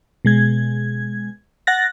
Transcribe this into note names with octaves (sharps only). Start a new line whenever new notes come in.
B2 G#3 G#6
F#5 F#6 A6 A#6